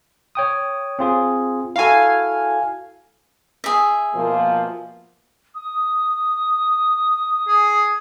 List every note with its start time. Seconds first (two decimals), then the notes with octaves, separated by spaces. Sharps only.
0.35 C#5 G5 D#6
0.99 C4 F4 G#4
1.76 E4 F#4 A4 F5 G#5
3.64 G#4 E5
4.15 B2 F3 A#3
5.55 D#6
7.48 G#4